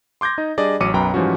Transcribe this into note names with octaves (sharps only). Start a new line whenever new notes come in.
C6 D6 G6 G#6 A#6
D#4 D#5
G3 D4 G#4 D5 D#5
A1 F#3 D6 C#7 D#7
B1 F#2 B4 G5 A#5 B5
G#2 E3 F3 G3 C#4 F#4